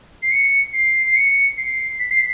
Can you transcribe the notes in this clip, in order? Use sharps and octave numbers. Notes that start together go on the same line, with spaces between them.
C7
C#7
C7
C7
C#7
C7
B6
C7